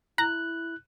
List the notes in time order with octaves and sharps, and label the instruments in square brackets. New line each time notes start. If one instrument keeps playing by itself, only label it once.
[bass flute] E4 [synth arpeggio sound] A#5 [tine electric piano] F#6